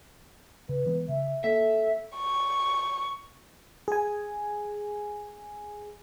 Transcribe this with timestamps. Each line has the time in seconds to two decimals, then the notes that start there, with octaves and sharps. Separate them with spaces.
0.69 C#3 B4
0.86 E3 G#3 B3
1.09 C#3 E5
1.44 A#3 A4 E5
2.17 C#6
3.88 G#4 G#5